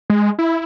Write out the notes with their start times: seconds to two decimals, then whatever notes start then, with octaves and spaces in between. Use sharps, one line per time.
0.10 G#3
0.39 E4